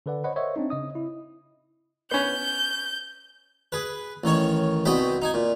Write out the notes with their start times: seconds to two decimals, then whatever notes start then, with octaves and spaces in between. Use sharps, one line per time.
0.06 D3 A4 B4 D5 F#5
0.24 C5 C#5 D#5 F#5 B5
0.36 A#4 C5 C#5 D#5 E5
0.56 C4 D4 D#4
0.70 C#3 D#5 D#6
0.95 E4
2.11 B3 C#4 G6
3.72 G#4 B4
4.24 A1 D#3 C#5
4.85 C2 B2 D#5 G5 B5
5.22 D#4 G#5
5.34 A#2